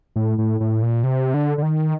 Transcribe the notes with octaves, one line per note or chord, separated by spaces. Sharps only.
A2
A2
A2
A#2
C3
D3
D3
D#3